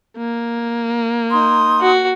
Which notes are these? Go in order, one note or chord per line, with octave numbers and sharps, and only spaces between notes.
A#3
D#4 C6 D#6
F#4